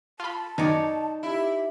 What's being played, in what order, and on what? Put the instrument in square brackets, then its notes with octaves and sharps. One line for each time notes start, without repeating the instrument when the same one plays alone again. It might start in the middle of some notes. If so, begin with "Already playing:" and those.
[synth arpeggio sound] F4 B5 [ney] A5
[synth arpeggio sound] F#2 D#3 [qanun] D#4 C#5 D5
[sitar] E4 [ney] G4